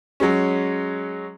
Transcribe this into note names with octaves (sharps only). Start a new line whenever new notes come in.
F#3 G#3 C#4